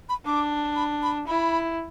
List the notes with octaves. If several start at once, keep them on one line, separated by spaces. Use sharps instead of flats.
B5
D4 D6
B5
B5
E4 B5